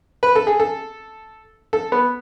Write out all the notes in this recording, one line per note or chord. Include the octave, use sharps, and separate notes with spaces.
B4
A4
G#4
A4
A4
B3